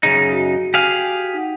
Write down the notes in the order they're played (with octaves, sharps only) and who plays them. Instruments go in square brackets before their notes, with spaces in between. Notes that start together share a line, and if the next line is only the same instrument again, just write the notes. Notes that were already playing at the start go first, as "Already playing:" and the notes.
[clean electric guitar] F#2 C#3 D#4 [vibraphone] G#4
[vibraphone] F#4
[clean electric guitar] G4 G#4 F5
[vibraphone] D#4 F#5